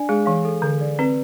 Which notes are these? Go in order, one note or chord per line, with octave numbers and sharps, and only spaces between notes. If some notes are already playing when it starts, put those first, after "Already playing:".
Already playing: D4 D5 G#5
G#3 G#4
E3 F5
A4
D3 A4
D5
C4 B4